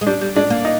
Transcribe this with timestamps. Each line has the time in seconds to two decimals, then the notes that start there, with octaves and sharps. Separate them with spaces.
0.01 G#3
0.07 G3 D4
0.21 G3
0.36 G#3 D4
0.50 A#3
0.65 D#4